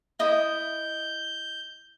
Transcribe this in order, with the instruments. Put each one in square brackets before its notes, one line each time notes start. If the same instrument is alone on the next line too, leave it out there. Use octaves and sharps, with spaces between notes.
[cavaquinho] E4 D#5 D#6 [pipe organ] G6